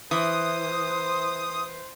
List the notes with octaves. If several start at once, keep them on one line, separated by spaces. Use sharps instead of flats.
E3 C5 D#6